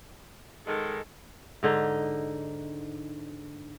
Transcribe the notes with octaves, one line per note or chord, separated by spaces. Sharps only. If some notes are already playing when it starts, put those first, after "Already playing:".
G#2 D#3 G#3 A4
G#2 D3 D#4